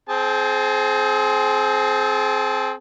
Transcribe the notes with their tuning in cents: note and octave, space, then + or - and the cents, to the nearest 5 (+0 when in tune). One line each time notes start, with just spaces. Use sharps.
C4 +0 G#4 +35 A5 -10